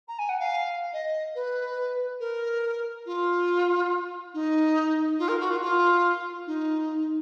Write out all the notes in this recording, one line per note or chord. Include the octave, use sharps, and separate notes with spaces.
A#5
G#5
F#5
F5
D#5
B4
A#4
F4
D#4
F4
A#4
F#4
F4
F4
D#4